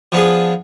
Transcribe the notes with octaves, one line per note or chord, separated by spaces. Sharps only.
F3 B3 D4 G#4